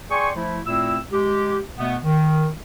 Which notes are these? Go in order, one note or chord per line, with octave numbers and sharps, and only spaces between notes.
G#4 D5 G5 G#5 C6 C#6
F3 A3 E4
A#2 A3 C4 E4 E6
G#3 G4
B2 A3 B3
D#3